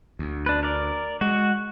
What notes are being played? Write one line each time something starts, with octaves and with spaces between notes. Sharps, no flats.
D2
D4 B4
A#4 D5
G#3 F#4